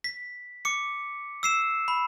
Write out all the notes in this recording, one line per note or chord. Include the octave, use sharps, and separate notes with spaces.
B6
D6 C#7
E6 C7 E7
B5